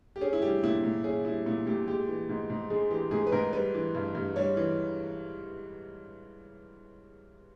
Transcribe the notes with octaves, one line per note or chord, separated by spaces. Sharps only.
G4
C#4 G#4
E4
G3 G4
A#2 E4
A#2
C#4 G#4
G3 E4
A#2 E4
A#2 G4
G#3 G4
E3
G#2
G#2
G#3 G#4
E3 G4
G#2 G#4
B4
G#2 A#4
G3 B4
E3
G2
G2
G3 C#5
E3